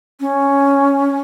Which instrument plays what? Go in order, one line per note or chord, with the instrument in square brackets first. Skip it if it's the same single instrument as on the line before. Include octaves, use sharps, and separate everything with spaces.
[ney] C#4